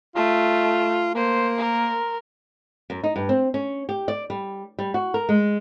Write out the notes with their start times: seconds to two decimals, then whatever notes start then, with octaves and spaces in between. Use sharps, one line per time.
0.16 A3 F4
1.15 A#3 C5
1.59 A#4
2.90 F#2
3.03 D#4
3.16 G2
3.29 C4
3.54 C#4
3.89 G4
4.08 D5
4.30 G3
4.79 G3
4.94 F#4
5.14 A#4
5.29 G#3